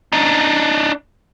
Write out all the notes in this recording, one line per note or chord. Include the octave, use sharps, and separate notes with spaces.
D4 D#4